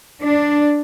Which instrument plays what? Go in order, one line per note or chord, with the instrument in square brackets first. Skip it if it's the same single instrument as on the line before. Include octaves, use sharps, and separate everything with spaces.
[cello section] D4